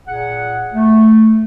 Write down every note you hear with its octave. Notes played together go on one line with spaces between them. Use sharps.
A#2 G#4 F#5
A3